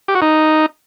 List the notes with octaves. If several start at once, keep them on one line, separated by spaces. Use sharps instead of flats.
G4
F#4
D#4